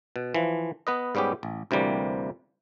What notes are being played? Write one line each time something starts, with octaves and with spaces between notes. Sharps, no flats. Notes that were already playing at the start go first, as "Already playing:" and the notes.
B2
E3 F3
B3 B4 D#5
G#2 G3 B3 C#4 G4
A1
D2 C3 E3 G3 A#3